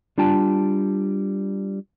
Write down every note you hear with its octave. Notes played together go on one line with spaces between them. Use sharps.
G3 D4 F4 G5 A5